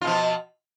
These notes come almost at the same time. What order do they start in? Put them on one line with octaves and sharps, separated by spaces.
F4 B2 F3